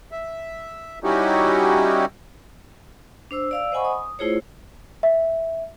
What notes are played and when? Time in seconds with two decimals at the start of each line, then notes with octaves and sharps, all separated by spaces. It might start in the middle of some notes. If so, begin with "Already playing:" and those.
0.12 E5
1.04 G3 C#4 D#4 E4 F#4 G4
3.31 D4 C5 E6
3.51 D5 F5 E6
3.72 C5 D#5 F#5 G#5 B5 C#6
3.85 D#6
4.19 A3 E4 F4 G#4 C5 C#5
5.03 E5